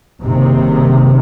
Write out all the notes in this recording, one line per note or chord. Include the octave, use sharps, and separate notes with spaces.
F#1 C3 D#3